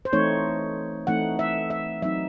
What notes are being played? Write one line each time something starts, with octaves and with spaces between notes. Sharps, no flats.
C5
E3 A3 C4 D#4 C#5
E3 A3 C4 D#4 F#5
E5
E5
F#3 C4 D#4 E5